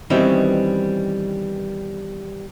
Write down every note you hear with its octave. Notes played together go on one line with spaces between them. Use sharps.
B2 D#3 E3 G3 C4 C#4